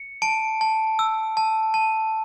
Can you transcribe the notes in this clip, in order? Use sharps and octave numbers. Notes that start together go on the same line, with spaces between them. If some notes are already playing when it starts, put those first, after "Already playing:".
Already playing: C#7
A5 D7
A5
E6
A5
A5